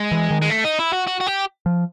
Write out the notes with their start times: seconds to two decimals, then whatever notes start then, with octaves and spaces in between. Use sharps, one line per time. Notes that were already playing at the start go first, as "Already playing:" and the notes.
Already playing: G#3
0.12 E3
0.31 D#3
0.42 G#3
0.50 A3
0.64 D#4
0.79 E4
0.93 F#4
1.07 F#4
1.21 F#4
1.27 G4
1.66 F3